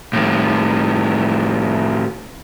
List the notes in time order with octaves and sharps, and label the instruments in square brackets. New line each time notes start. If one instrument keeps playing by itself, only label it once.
[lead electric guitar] A2 D#3